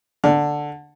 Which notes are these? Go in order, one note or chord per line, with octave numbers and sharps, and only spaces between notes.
D3